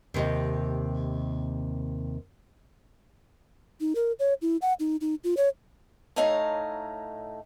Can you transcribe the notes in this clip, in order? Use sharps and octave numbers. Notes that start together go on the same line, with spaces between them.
D#2 C3 D#5
D#4
A#4
C#5
E4
F#5
D#4
D#4
F4
C#5
A2 A3 D#4 C#5 F5 A#5